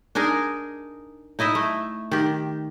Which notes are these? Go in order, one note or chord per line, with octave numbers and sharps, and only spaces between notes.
D4 D#4 G#4 A#4
D#4 E4 D#5 E5
A3
D#3 G4